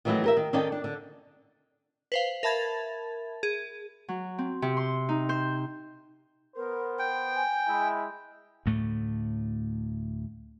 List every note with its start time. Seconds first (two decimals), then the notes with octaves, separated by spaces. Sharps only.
0.05 D#3 E3 F#3 A3 E4 F#4
0.24 G4 A#4 E5
0.37 D#3
0.53 D#3 C#4 D#4 A4 D5 G5
0.72 D4
0.84 D3
2.12 B4 C5 F5
2.43 A#4 E5 A5 B5 G#6 A6
3.43 G#4
4.08 F#3
4.38 C4
4.62 C3
4.77 C6
5.09 D#4
5.29 C5
6.56 B3 A#4 C5
6.99 G5
7.35 G#5
7.67 G#3 E4
8.66 D2 A2 A3